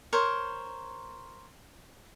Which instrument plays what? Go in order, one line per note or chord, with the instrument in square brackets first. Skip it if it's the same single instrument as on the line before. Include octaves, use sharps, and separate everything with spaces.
[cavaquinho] A#4 C5 C#5